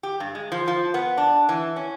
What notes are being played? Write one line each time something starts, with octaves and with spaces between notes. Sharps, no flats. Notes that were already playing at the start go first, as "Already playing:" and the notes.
G4
G2
G#3
F3
F3
B3
D4
E3
C#4